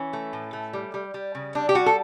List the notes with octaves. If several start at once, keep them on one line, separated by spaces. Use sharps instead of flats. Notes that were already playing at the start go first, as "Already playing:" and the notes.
Already playing: E3 C#4
A3
A2
A3
G3
G3
G3
C#3
G3 D4
G4
G3 F#4
A4